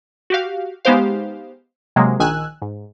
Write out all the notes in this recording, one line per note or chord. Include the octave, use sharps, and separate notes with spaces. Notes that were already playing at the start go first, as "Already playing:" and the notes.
F#4 G4 F5
G#3 B3 D#4 G4 C5 F5
C3 F#3 G#3 A#3
A#1 D#3 G#5 E6 F#6
G#2